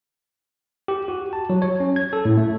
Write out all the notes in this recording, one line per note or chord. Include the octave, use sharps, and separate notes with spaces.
G4
F#4
A5
F#3
C#5
C#4
G#6
A4
A2
A3